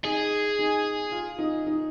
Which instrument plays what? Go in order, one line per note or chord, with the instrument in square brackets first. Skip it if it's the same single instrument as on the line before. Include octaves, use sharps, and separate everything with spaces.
[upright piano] D#4 [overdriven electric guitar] G#4
[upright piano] D#4
F4
D#4
D#4